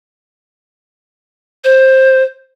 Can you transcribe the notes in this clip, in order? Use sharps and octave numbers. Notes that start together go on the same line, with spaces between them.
C5